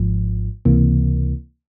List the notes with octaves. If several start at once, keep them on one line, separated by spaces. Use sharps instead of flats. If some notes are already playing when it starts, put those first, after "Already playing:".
Already playing: G#1 G#2 F3
C#2 C3 E3 A#3